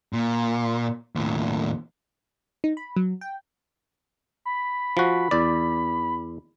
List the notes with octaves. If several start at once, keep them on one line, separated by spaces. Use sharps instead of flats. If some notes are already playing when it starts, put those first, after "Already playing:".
A#2
D#2 A2
D#4
B5
F#3
G5
B5
F3 F#4
E2 D5